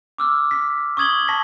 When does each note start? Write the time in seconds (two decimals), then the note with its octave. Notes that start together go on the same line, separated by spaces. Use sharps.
0.18 D6 E6 F6
0.51 B6
0.97 C#6 D#6 G#6 F#7 G7
1.28 A5 C#6 A#6 B6